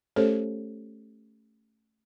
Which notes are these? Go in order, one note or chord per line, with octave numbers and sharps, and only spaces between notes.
A3 C#4 G4 A4 C5 C#5